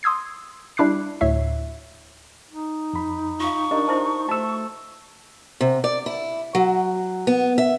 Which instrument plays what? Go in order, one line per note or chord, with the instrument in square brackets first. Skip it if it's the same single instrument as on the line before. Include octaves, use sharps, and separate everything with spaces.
[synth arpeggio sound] C6 D#6 E6 G#6 C7
G3 D4 E4 D6 F#6 C7
D2 A2 C#5 E5 C7
[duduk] D#4
[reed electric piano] F2 B5
[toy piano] F4 F5 [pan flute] C#6
[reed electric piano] D4 A#4 [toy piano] G4 D#5
[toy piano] E4 C5 A5
[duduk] A3 [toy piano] F#4 C5 [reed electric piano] A5 E6
[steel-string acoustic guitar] C3
D5
E4
F#3
B3
E5